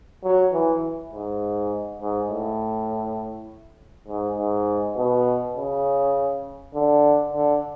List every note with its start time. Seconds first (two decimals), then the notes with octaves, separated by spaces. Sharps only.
0.23 F#3
0.53 E3
1.12 G#2
2.01 G#2
2.30 A2
4.08 G#2
4.38 G#2
4.96 B2
5.57 C#3
6.74 D3
7.33 D3